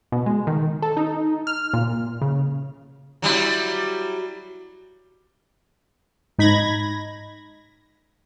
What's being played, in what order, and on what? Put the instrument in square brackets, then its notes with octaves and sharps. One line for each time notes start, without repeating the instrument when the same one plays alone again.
[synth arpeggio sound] B2
G#3
D#3
A4
D#4
F6
A#2
C#3
[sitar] F#3 G3 E4
[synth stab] G#2 D#4 B5 G#6 A#6